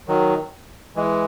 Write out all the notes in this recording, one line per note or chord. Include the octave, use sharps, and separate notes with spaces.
D#3 F#3
E3 G#3